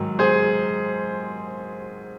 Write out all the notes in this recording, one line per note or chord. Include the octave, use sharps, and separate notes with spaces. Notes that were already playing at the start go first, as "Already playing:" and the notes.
Already playing: G#2 D#3 F#3
G#4 C5